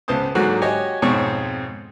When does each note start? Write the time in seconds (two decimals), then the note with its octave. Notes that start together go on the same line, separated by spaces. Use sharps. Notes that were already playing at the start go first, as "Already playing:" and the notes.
0.08 C#2 B3 C5 A5 D#6
0.35 G#2 D3 F#3 A#3 F#4
0.62 F#4 G4 C#5 D#5 G#5
1.02 F2 G#2 B2 C4 C#5 C#6